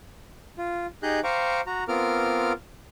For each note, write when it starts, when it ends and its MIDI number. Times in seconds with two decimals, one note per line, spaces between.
0.58 0.86 65
1.03 1.20 63
1.03 1.20 67
1.03 1.20 68
1.03 1.20 75
1.03 1.20 90
1.03 1.20 91
1.24 1.61 72
1.24 1.61 77
1.24 1.61 79
1.24 1.61 82
1.24 1.61 85
1.24 1.61 86
1.67 1.84 66
1.67 1.84 82
1.88 2.53 59
1.88 2.53 60
1.88 2.53 65
1.88 2.53 70
1.88 2.53 86
1.88 2.53 89